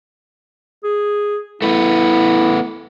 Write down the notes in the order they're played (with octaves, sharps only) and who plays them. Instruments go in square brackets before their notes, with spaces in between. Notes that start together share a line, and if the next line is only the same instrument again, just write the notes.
[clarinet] G#4
[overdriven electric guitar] A3 B3 [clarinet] E4